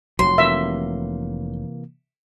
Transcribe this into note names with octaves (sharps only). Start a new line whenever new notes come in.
F1 C#2 F#3 C6
C3 E3 A#3 E5